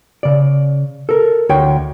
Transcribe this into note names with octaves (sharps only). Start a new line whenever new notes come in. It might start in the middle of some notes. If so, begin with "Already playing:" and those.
C#3 D5
A4 A#4
D2 C#5 G5